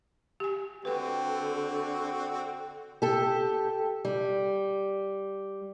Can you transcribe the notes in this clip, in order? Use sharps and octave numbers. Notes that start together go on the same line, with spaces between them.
G4 G#5
D3 C4 F#4 B4 G5
G4 A4
G3